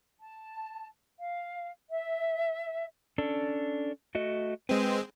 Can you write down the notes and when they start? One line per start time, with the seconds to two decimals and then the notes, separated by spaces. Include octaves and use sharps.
0.20 A5
1.19 F5
1.88 E5
3.18 C#4 D4 A4
4.15 A3 F#4 D#5
4.69 G#3 C4 B4